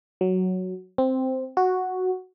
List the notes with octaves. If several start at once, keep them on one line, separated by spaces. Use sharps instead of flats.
F#3
C4
F#4